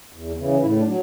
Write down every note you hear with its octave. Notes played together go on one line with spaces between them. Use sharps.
E2
C#3 E3
A2 E4
D4
F#3